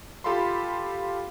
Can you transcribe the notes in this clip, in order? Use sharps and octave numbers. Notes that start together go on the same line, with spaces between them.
F4 G4 A4 F5 B5 C6